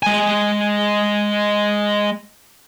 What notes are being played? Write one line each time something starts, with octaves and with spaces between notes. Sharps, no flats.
G#3 G#5